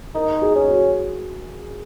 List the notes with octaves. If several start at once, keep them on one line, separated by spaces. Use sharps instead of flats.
D#4 A#4
G#4
C#4
F#4